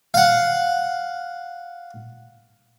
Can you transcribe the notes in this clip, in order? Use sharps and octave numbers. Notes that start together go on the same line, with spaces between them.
F5 F#5